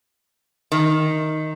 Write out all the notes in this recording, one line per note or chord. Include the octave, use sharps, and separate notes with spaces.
D#3